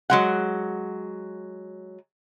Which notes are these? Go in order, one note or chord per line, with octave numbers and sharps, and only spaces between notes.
F#3 G#3 F#5